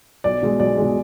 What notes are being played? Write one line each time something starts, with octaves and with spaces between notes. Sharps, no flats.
B1 D5
B2 G#3
B1 D5
B2 G#3